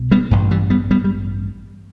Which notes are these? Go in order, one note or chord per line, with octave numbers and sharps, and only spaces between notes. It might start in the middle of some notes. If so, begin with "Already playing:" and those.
Already playing: C2 B2
G3 B3
A1 G2
E3 G3
G3 B3
G3 B3
G3